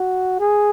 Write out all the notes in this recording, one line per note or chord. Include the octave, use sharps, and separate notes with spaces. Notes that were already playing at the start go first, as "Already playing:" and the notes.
Already playing: F#4
G#4